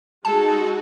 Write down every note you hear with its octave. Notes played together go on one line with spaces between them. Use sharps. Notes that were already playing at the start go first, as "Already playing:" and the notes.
G#3 D#4 F#4 A4 A5